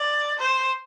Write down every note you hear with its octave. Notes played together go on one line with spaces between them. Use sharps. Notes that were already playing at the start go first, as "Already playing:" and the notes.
Already playing: D5
C5